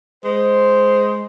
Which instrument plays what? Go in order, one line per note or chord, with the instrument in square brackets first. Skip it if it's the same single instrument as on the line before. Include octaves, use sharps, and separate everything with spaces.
[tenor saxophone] G#3 [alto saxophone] C5